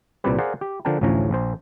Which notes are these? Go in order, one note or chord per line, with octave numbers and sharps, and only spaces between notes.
C2 A#2 G3 C4 G4 B4
G#4 A#4 C5 D5 F5 F#5
G4
D3 F3 D4 A#4 G5 A5
A1 D2 A2 F3 C#4 A#5
A#1 C5